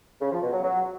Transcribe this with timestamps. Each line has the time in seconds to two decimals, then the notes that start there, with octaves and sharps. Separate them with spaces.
0.21 C#3
0.32 F3
0.42 B2
0.53 F#3
0.63 F#3